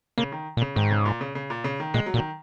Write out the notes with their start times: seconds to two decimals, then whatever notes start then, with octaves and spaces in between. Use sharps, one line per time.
0.18 C#3 A#3
0.32 D#3
0.57 A#2
0.62 C#3
0.76 G#2 D#3
0.91 C#3
1.06 A#2
1.21 C#3
1.35 C#3
1.50 A#2
1.64 C#3
1.80 D#3
1.94 A#2 G#3
2.06 F#3
2.14 A#2
2.17 D#3